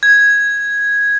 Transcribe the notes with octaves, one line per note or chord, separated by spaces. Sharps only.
G#6